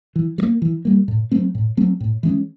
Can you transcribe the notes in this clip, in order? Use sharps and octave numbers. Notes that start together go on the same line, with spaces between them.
E3
G3
A#3
E3
G3 A#3
A2
F#3 A3 C4
A2
F#3 A3 C4
A2
E3 G#3 C#4